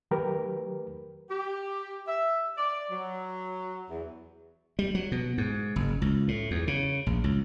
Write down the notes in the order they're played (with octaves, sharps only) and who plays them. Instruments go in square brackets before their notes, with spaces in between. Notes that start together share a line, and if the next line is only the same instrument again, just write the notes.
[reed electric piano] D#3 F#3 A3 G4 A#4 B4
[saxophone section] G4
E5
D5
F#3
E2
[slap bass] G3
F#3
B2
G#2
F#1
C#2
A2
E2
C#3
A#1
C#2